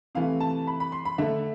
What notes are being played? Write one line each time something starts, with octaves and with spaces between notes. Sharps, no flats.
C3 E3 A3 F5
A5
B5
B5
C6
B5
D3 A3 E5